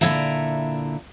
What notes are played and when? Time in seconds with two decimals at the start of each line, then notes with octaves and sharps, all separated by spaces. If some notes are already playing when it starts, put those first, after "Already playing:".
0.01 A#2 D3 B3 E4 E5 A#5